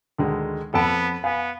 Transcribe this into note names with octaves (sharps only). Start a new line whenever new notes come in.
D2 D3 D#3 G#3
F2 B3 A4 F#5 A5 B5 D7
B3 F5 G#5